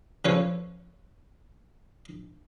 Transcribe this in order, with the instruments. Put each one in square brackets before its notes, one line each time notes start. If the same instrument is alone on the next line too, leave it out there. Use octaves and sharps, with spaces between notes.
[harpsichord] C#3 F3 C#4 A4 B4 C#5